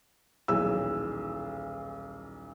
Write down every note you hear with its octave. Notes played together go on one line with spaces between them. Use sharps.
D#1 B1 E3 G#4 E6